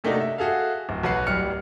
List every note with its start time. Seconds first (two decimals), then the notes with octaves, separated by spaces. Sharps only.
0.04 C3 A3 A#3 D4 D#4 F#4
0.20 E5
0.38 F#4 G#4 A4 E5 F5
0.89 D1
1.03 B1 F#4 B4 F#5 C7
1.27 D1 G3 F6 C#7